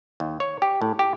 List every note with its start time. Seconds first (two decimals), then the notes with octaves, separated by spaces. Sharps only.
0.20 D#2
0.40 C#5
0.62 G4
0.82 A2
0.99 G4